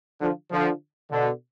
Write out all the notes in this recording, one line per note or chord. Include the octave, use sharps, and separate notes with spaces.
D3 F3
D3 F3
B2 D3